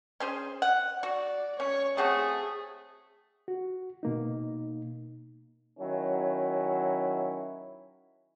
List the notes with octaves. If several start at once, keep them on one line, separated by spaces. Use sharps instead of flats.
C#4 G#4 C5
F#5
F#4 D5
C#4 C#5
A3 C4 F#4 G#4
F#4
B2 A#3 D#4
D#3 F#3 C#4 E4